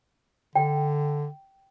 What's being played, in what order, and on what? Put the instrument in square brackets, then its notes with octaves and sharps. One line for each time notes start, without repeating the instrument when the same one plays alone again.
[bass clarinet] D3 [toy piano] G5